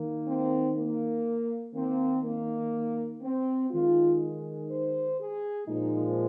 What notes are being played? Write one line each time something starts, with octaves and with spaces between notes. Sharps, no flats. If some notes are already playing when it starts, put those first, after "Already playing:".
Already playing: D#3 A#3
C4
A#3
D#3 A#3 C4
A#3
C4
D#3 G#3 F4
C5
G#4
A#2 F3 G#3 D#4